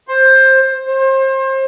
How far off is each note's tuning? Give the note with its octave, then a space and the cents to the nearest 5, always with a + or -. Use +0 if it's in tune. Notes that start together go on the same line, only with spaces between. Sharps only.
C5 +15
C5 +30